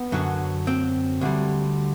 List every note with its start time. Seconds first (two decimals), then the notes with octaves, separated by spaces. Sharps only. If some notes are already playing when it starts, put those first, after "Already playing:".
Already playing: B3
0.12 F#2 D3 F#3
0.67 C4
1.21 D2 D3 G3